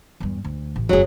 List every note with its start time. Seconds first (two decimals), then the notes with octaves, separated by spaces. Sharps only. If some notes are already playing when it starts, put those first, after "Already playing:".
0.20 E2 G2
0.44 D2
0.76 A1
0.89 F#1 D#2 F#3 G#4